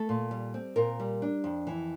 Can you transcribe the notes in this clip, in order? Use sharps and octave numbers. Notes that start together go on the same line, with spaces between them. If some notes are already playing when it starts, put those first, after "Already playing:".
Already playing: A3 A4
A#2
G3
C4
A#2 A#4
G3
D4
F2
E3